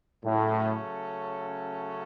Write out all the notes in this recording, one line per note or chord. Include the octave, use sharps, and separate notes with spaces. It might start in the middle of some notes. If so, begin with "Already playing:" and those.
A2 C#3 F#3 A3 C#4 A4